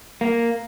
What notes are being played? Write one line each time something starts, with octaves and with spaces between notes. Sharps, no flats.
A#3